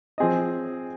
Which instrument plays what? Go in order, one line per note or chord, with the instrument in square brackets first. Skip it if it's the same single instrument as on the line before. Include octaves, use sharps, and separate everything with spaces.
[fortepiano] F3 C4 G#4 D#5